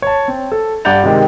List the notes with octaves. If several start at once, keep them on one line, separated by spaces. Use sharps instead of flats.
C#5 A5
C4
A4
G2 D5 F#5 G6 A6 F7
C3 D#3 G#3 G4